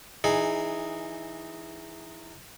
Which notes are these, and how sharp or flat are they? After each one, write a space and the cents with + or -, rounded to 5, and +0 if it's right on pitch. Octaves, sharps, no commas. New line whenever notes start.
E3 -5 D#4 -20 G#4 +0